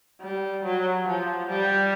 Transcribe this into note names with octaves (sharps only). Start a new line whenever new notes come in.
G3
F#3
F3
G3